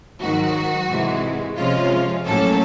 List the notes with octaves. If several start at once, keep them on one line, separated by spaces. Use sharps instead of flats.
G#2 D#3 F#3 F#4
C3 E3 G#3
C3 F3 G#3 C#4 F4
A2 F#3 A#3 C#4 A4